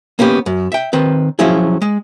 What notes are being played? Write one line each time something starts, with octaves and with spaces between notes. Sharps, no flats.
A#3 B3 C#4 G4
F#2
E5 G5
D#3 C4 B4
F3 F#3 C#4 E4 G#4
G#3